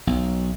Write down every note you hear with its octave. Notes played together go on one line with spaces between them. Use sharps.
B1